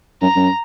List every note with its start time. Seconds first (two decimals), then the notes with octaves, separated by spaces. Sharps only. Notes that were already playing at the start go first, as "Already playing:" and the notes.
0.22 F#2 A#5
0.36 F#2